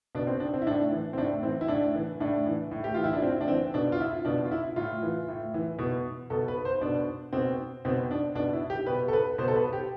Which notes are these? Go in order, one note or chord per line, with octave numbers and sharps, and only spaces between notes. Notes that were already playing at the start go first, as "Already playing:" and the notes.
B2 D4
C4
D4
C4
E4
A2 D4
E3
C4
A2 D4
E3 C4
E4
A2 D4
E3
A2 D4
E3
A2
G4
E3 F4
E4
D4
A2 C4
D4
E3 C4
B2 D4
F4
E4
B2 D4
F4
E4
A2 F4
E3
A2
E3
B2
B2 A4
B4
C5
B2 D4
B2 C4
B2 C4
D4
B2 D4
E4
G4
B2 B4
A4
B4
B2 C5
A4
B4
G4